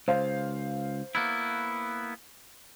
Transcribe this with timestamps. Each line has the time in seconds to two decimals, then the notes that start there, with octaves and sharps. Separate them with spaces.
0.08 C#2 C5 F5
1.15 A#3 B3 E4